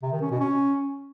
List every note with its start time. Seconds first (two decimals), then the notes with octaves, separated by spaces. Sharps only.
0.03 C3
0.12 D#3
0.21 C#4
0.31 B2
0.40 C#4